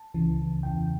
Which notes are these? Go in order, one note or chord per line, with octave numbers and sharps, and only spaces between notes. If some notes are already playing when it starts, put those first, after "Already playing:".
Already playing: A5
C#2 C#3 E3
E2 C#3 E3 G5